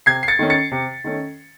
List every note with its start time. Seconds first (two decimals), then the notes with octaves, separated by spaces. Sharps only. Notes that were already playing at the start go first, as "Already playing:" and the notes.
0.06 C3 G#6 C7
0.23 C7
0.28 A6 C#7
0.39 D#3 A3 C#4
0.50 A6 C#7
0.72 C3
1.04 D#3 A3 C#4